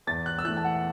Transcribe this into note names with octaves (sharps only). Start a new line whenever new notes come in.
E2 A6
F#6
E6
E3 A3 F#6
A5
F#5